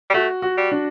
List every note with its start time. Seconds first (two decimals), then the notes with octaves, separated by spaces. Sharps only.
0.10 G3
0.14 A3 F#4
0.42 F#4
0.57 G3
0.72 D4